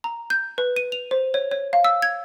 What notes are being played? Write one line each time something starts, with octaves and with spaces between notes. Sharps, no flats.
A#5
G6
B4
D#7
F7
C5
C#5
C#5
F5
E6
G#6